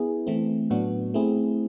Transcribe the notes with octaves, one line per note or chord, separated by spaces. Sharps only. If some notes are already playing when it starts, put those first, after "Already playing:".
Already playing: B3 E4 G#4
E3 A3 C4
A2 F#3 B3 D4 F#4
A3 C4 E4 G#4